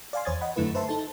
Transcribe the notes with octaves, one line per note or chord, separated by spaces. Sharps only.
D5 F5 G#5 C6
E2 C5 C#5 D#6 G#6 A6
D#5 F#5 B5
F#2 D3 A3 E4 B4
B4 C5 E5 A5 C6
D#4 A4 A5